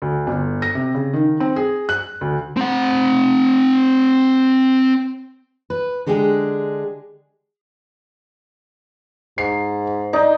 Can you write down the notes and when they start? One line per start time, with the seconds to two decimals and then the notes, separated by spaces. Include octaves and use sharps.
0.02 D2
0.27 G1
0.62 A#6
0.75 C3
0.95 C#3
1.13 D#3
1.40 C4
1.56 G#4
1.89 F#6
2.21 D2
2.57 C4 F#5
5.70 B4
6.06 D3 G#3 D4 G4 G#4
9.38 G#2 C7
10.13 D#4 D5 D#5